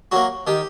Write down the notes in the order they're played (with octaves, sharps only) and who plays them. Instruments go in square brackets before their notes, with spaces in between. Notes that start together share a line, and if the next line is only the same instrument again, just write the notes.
[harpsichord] F#3 A#3 F#4
D#3 G4